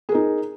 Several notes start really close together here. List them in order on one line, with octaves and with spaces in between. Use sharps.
G#4 A#4 D#4